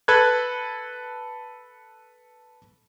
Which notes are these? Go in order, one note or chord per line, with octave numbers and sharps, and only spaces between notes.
A4 B4 B5 F#6 G#6